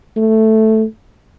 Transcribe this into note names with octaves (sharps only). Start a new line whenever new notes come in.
A3